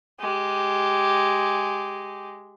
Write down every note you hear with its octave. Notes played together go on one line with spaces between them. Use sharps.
G#3 G4